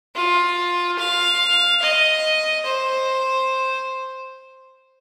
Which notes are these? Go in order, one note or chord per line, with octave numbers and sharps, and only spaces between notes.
F4
F5
D#5
C5